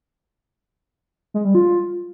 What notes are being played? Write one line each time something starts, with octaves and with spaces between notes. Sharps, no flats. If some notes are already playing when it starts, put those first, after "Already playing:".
G#3
G3
F4